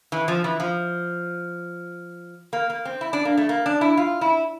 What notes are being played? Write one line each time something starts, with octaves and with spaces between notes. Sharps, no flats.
E3
F3
E3
F3
A#3
A#3
C4
E4
D4
A#3
A3
A#3
D4
E4
F4
E4